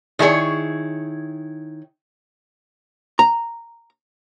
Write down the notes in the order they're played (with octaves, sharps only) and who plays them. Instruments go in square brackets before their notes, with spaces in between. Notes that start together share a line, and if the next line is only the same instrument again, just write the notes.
[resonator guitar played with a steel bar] D#3 E4 G#4 A#4 C#5
[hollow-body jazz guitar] A#5